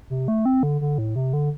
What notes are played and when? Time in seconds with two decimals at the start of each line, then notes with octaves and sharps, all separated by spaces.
0.10 C3
0.28 A3
0.45 C4
0.63 D3
0.81 D3
0.98 A2
1.16 C3
1.33 D3